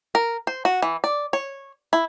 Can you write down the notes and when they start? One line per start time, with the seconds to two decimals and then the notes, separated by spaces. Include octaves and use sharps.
0.15 A#4
0.47 C5
0.65 F#4
0.82 E3
1.04 D5
1.33 C#5
1.93 E4